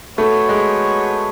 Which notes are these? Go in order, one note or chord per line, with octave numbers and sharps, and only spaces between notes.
A3 B3 F#4 C#5
G#3